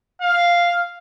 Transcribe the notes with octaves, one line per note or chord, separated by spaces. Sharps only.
F5